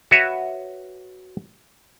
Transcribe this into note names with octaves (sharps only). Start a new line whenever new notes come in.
F#4 B4 C#5 E5